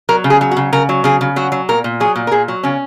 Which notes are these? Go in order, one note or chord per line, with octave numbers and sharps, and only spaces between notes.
F#3 A#4
C#3
G#4
F#3
F#4
C#3
C#3 A#4
F#3
C#3 G#4
C#3
F#3 F#4
F#3
A#2 A#4
A#2
F#3 G#4
A#2
A#4
A#2 G#4
F#3
C#3 C#4